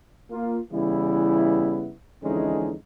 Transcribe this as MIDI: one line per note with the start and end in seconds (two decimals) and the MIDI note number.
0.31 0.60 58
0.31 0.60 65
0.72 1.92 49
0.72 1.92 52
0.72 1.92 55
0.72 1.92 59
0.72 1.92 64
2.23 2.73 41
2.23 2.73 50
2.23 2.73 52
2.23 2.73 56
2.23 2.73 61
2.23 2.73 63